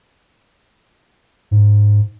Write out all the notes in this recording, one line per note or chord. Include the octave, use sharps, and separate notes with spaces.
G#2